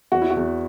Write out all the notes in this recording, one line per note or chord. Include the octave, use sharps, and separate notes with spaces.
E2 F#4
E4
F#4
E2